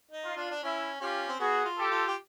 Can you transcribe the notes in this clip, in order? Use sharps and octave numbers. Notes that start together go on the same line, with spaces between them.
D#4
F4
D4
D4
C#4 E4
C#4 F4 G4
C4
B3 F#4 G#4
F4
G4 A4
F4
G4